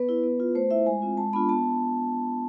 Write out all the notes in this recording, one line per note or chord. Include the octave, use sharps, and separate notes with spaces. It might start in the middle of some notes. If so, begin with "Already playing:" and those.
Already playing: B3 B4
E4
B3
F4
A3 C5
E4 E5
G#3 G#5
C4 F4
G#3 A5
B3 D4 F4 B5
B3 A5